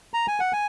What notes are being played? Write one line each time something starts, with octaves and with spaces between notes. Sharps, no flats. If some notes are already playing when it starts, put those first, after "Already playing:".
A#5
G#5
F#5
G#5